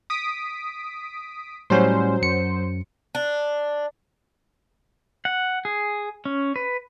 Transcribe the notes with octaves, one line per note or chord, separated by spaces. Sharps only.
D#6 B6 D7
A2 F#3 G3 C#4 C5
F#2 C#7
D4
F#5
G#4
C#4
B4